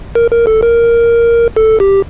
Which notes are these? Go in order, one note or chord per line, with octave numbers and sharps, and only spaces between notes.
A#4
A#4
A4
A#4
A4
G4